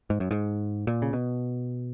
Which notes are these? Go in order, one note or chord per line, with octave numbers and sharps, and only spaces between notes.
G#2
F#2
G#2
A#2
C#3
B2